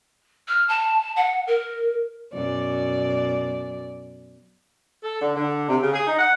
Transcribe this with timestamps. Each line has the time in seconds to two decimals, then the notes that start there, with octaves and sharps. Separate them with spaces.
0.48 F6
0.68 A5
1.16 F#5
1.47 A#4
2.34 F#2 B2 D5
5.02 A4
5.19 D3
5.34 D3
5.67 C3
5.80 C#3
5.91 G#4
6.05 D#4
6.17 F#5